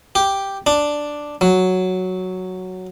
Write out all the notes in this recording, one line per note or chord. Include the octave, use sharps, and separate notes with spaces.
G4
D4
F#3